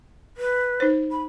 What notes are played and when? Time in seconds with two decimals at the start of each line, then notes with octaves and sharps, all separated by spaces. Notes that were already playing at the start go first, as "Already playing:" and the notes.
0.37 B4
0.80 D#4 C5
1.11 B5